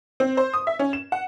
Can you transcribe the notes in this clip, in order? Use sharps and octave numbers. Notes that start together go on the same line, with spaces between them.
C4
C5
D#6
E5
C#4
E7
F#5